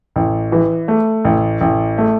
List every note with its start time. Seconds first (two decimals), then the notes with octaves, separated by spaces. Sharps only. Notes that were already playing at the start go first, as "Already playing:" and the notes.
0.16 A1
0.52 E3
0.88 A3
1.25 A1
1.61 A1
1.98 A3